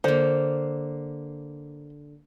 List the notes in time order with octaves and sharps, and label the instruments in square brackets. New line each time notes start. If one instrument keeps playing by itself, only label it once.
[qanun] D3 A#3 [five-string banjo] C5